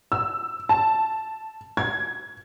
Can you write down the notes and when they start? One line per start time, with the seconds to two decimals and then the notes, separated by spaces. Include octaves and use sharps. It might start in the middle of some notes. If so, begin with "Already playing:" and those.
0.12 E6
0.69 A5
1.77 G#6